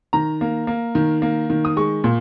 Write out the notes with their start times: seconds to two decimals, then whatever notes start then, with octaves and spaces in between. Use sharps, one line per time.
0.13 D#3 A#5
0.41 A#3
0.67 A#3
0.95 D#3
1.22 A#3
1.50 D#3
1.65 D#6
1.77 G#3 C#6
2.04 A#2